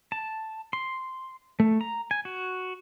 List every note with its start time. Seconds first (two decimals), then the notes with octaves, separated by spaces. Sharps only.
0.12 A5
0.73 C6
1.60 A3
1.81 A#5
2.11 G#5
2.25 F#4